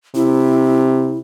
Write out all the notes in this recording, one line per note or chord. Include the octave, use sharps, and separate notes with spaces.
C3 E4